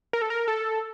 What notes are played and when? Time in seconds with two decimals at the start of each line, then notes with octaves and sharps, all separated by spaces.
0.13 A#4
0.22 A4
0.30 A#4
0.48 A4